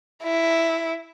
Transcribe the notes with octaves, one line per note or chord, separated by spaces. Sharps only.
E4